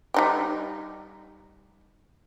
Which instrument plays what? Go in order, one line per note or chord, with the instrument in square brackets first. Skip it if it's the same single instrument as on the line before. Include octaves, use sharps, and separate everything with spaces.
[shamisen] G3 D#4 G4